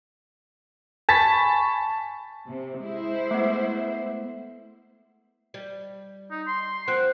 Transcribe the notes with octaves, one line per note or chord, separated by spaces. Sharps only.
G#5 A5 B5 C#6 A6 B6
C3
G#3 E4 C5
A3 B3
G3
D#4
C6
F3 C4 F#5